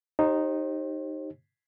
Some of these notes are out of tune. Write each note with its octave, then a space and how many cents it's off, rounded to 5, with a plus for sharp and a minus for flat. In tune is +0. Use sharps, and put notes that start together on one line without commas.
D#4 -5 G4 -10 C5 +40